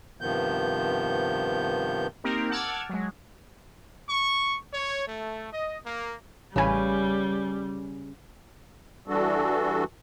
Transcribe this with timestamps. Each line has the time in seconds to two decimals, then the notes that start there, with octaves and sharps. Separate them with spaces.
0.21 G2 C3 D#3 F3 B3 G6
2.24 A#3 C4 D#4 G4 A#4
2.51 F#5 A5 D6 E6 F6 G#6
2.89 F#3 G#3
4.09 C#6
4.72 C#5
5.06 A3
5.51 D#5
5.85 A#3
6.56 A1 C#3 G3 C#4 B4 G#5
9.08 E3 G3 D4 F#4 A4